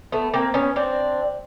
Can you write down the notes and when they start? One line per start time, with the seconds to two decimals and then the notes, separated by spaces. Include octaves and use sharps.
0.12 A3 B3
0.34 A#3 C4
0.54 B3 C#4
0.76 C4 D4